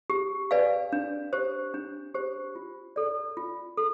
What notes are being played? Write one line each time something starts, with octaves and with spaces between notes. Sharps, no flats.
G4
B4 D5 F5 G#5
D4
G4 C5
D4
G4 C5
F4
A4 D5
F4
A4